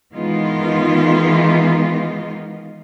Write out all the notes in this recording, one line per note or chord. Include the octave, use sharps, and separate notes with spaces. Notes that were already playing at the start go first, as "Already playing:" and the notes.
D#3 E3 G#3 B3 D#4 F4